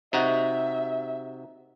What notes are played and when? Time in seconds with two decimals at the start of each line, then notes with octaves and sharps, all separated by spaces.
0.13 C3 D#4 F#4 E5